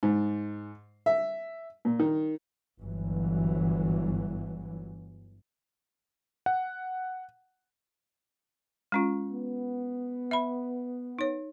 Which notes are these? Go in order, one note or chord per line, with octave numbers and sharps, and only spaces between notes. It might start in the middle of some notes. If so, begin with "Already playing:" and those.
G#2
E5
A#2
D#3
G1 E3 F#3
F#5
G#3 C#4 F4
B3
E5 B5
D#4 C#5